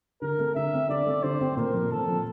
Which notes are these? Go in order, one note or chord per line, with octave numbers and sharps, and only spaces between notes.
D3 A#4
A3 C4
D3 E5
A3 C4
D3 D5
A3 C4
D3 C5
A3 C4
A#2 A#4
F3 C4
A#2 A4
F3 C4